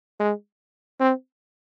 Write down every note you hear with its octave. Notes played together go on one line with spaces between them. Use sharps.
G#3
C4